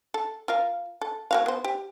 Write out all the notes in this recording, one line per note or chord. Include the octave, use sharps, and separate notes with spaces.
A4
F4 A#4 F5
A4
A#3 F#4 F5
B3 C5
G4